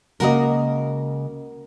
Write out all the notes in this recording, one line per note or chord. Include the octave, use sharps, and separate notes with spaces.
C#2 C#3 A#3 F#4 A#4 D#5